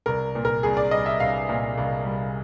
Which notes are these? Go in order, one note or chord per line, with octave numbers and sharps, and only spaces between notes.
C2 A#4
A#2
A#4
C2 G#4
D5
G3 D#5
E5
C2 F5
A#2
C2
G3